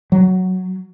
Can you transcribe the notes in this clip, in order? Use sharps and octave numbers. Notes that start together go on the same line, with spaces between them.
F#3